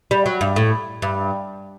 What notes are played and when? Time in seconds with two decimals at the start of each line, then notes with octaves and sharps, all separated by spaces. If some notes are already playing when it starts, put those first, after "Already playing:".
0.11 G3
0.26 F#3
0.41 G2
0.56 A2
1.02 G2